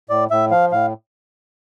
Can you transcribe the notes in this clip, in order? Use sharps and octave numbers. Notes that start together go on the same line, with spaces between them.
A2 D5
A2 E5
F3 F5
A2 F5